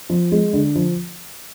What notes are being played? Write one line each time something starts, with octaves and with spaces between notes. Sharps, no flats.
F3
G#3
D3
F3